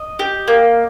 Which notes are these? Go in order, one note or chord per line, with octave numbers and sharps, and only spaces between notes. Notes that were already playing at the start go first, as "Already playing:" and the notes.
Already playing: D#5
G4
A#3